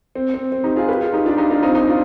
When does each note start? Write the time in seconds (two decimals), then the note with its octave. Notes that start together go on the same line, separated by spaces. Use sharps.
0.15 C4
0.34 C4
0.52 C4
0.64 D#4 G4
0.76 F4 G#4
0.88 G4 B4
1.01 F4 G#4
1.13 D#4 G4
1.26 D4 F4
1.38 D#4 G4
1.50 D4 F4
1.63 C4 D#4
1.75 C4 D#4
1.88 D4 F4